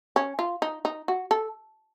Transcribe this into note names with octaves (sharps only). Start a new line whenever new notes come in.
C#4
F4
D#4
D#4
F#4
A4